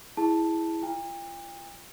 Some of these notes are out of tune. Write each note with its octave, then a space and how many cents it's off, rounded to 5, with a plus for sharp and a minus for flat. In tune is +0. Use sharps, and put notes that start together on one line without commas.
E4 +0 G#4 +0 A5 +0
F4 -40 G5 +40